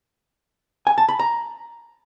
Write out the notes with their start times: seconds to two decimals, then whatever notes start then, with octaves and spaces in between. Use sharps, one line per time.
0.87 G#5
0.98 A5
1.09 B5
1.19 A#5